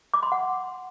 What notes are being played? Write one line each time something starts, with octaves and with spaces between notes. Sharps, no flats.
D6
C6
F#5